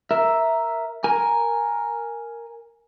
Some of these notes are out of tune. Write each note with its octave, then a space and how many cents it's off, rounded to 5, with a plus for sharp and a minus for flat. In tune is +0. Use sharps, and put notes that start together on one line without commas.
A#4 +0 E5 +0
A#4 +0 G#5 +0